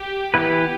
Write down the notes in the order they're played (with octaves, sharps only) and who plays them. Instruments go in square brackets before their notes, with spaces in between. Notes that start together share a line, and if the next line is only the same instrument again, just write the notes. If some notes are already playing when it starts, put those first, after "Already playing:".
Already playing: [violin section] G4
[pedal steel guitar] E3 B3 E4 B4 [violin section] G4